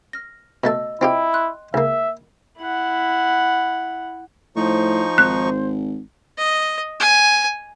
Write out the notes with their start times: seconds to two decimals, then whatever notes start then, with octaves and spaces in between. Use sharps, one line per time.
0.13 F6 A#6
0.64 B2 A3 D#5 A5 E6
1.01 C4 E4 F4 G4 D#5 G5
1.33 C6 F#6
1.74 C#2 A#3 E5
2.58 E4 F#5
4.56 A2 F3 D#4 C5 C#6
5.18 G#1 F#6
6.38 D#5
7.00 G#5